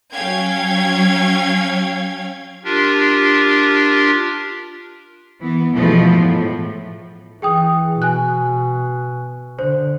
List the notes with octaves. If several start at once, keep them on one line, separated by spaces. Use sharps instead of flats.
F#3 C#4 F5 G5 G#6
D4 F4 G4 A#4
E3 B3
B2 E3 F3 G#3 A3 B3
A2
E3 G#4 G5 D#6
B2 G#5 F#6
D3 C5